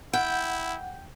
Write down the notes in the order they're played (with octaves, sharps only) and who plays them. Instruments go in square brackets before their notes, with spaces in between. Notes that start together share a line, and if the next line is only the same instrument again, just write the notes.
[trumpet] E4 [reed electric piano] F#5 [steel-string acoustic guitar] G5